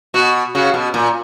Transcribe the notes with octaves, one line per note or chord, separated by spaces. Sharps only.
B2 F#4
C#3 F#4
B2
A#2